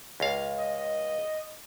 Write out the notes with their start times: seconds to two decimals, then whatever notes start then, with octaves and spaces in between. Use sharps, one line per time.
0.20 C#2 F5
0.58 D#5